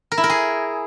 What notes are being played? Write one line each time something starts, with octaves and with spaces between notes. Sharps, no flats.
A#4
E4
A#4
G#4